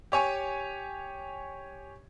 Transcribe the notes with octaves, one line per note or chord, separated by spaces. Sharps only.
G4 C#5 G#5 C#6